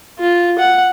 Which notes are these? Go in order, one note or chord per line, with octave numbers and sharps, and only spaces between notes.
F4
F#5